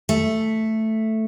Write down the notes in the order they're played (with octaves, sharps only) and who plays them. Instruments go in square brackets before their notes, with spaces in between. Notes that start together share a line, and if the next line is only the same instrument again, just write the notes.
[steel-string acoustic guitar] A3